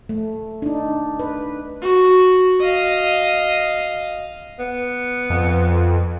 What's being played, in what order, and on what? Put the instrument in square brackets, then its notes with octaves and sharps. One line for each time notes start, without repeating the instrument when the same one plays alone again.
[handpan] A3
D4 D#4
B4
[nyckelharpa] F#4
D#5 F5
[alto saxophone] B3
[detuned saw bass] F2